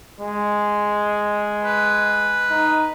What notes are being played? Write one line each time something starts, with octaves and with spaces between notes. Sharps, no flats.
G#3
B4
D#4